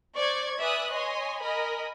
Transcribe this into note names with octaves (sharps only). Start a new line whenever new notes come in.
C5 D5 C#6 G#6
B4 D5 E5 G#5 D#6 F#6
C#5 D#5 G#5 C6
A#4 D#5 G#5 B5